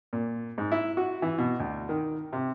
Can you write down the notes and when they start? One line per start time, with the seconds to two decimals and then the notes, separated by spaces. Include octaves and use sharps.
0.13 A#2
0.58 G#2
0.72 E4
0.97 F#4
1.22 E3
1.38 B2
1.60 D2
1.89 D#3
2.33 C3